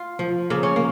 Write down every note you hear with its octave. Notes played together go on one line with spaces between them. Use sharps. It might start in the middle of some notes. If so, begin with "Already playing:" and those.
Already playing: F4
F3
C#3 A#3
C#4
A#3